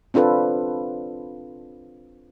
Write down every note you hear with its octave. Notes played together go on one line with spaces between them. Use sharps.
C4 D4 F4 A4 B4